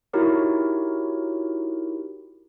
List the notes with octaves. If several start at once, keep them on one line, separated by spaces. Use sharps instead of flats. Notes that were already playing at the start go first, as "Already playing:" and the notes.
D#4 E4 F#4 G4 A#4 C#5